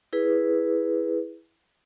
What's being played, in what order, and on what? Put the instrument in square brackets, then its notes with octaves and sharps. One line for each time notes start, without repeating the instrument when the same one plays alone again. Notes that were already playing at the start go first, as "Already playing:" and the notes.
[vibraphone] E4 G#4 B4